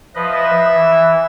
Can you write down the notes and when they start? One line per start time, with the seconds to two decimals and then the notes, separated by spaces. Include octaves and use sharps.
0.15 F3 B4 D#5 E5
0.73 E3